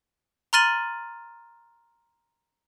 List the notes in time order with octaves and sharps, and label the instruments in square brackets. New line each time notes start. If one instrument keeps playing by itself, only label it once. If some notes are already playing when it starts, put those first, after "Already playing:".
[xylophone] A#5 C6 F6 A6 D#7 F#7